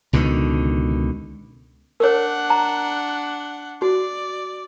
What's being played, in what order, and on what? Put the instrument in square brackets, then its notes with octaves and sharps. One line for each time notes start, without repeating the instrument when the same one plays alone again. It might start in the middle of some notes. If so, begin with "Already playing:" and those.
[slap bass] C#2 B2 D3 D#3
[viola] D4 F#5 [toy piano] A#4 C#5
[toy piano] A#5
[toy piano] F#4 [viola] D5